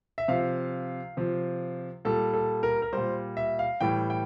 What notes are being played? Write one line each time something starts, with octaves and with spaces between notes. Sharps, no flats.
E5
C3 F3 F5
C3 F3
A#2 G3 A4
A4
A#4
A#4
A#2 G3 C5
E5
F5
A2 E3 G3 G5
G5